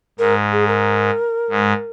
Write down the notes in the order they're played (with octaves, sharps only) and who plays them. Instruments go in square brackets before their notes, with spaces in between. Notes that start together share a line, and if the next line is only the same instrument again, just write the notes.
[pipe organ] G#2 [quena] A#4
[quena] G#4
A#4
[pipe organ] G#2